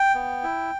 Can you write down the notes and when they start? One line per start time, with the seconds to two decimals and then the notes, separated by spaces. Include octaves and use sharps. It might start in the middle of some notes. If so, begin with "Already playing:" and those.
Already playing: G5
0.15 B3
0.43 E4